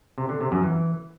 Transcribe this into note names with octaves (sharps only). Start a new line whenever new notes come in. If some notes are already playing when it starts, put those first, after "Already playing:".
C3
D3
C3
F#2
E3